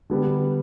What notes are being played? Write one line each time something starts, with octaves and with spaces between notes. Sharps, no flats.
D3 G3 B3 G4